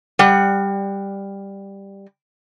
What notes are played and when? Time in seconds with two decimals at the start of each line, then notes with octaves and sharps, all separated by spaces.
0.19 G3 F#5